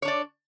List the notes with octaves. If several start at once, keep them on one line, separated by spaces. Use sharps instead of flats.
D4 C#5 D5